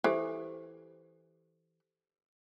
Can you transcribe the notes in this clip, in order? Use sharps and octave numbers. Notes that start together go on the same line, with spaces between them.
E3 G4 A4 C5